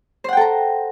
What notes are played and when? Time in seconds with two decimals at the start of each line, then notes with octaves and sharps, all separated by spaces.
0.24 C5
0.29 F#5
0.33 G5
0.37 A4
0.41 A#5